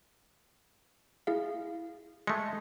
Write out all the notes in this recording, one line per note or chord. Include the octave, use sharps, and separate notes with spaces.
E4 G#4 F5
G#3 A3 C#7